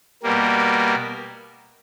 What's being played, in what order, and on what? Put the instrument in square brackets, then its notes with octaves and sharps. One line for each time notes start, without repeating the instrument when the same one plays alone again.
[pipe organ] B2 G3 A#3